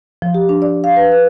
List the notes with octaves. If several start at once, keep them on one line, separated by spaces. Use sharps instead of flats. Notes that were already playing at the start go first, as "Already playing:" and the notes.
F3
G4
D4
D5
F5
B4
B4